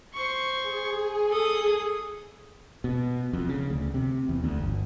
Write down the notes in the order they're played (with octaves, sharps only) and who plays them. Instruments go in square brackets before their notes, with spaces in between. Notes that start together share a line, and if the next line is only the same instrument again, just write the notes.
[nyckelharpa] C5 C#6
[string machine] G#4
[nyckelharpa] A4 D#6
[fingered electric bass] B2
F2
C#3
D2
C3
E2
D2
G1